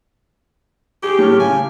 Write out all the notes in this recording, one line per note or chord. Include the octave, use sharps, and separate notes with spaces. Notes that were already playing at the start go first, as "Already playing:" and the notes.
G4 G#4
A2 C#6 F6
C#3 G#5